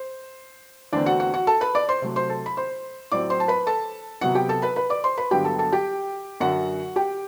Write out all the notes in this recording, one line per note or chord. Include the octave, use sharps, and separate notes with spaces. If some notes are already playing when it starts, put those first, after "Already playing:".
Already playing: C5
E2 D3 A3 C4 D4 D5
F#4 F#5
F#4 F#5
F#4 F#5
A4 A5
B4 B5
D5 D6
C5 C6
C3 F#3 A3
C5 C6
A4 A5
B5
C5 C6
A2 F#3 C4 D5 D6
C5 C6
A5
B4 B5
A4 A5
C3 F#3 B3 F#4 F#5
G4 G5
A4 A5
B4 B5
B4 B5
D5 D6
C5 C6
B4 B5
G2 D3 F#3 B3 G4 G5
A4 A5
A4 A5
G4 G5
F#2 D3 F#3 F#4 F#5
G4 G5